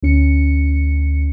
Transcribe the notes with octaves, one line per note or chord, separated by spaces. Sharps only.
D2 C#4 C#7